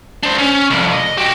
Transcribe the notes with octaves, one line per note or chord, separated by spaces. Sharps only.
D4 C5
C#4
C2 F2
D#5
F#4 G4